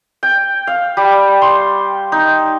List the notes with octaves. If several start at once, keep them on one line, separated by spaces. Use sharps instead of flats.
G5
F5
G3
C6
D#4